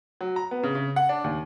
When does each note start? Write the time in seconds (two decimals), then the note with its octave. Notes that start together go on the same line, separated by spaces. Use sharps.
0.21 F#3
0.36 A#5
0.51 B3
0.63 C#3
0.75 C#3
0.96 F#5
1.09 D4
1.24 D#2